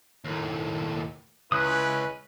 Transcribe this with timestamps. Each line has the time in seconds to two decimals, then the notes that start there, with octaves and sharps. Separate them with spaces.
0.25 D#2 A2
1.52 C#2 C#4 E4 B4 D#6 F#6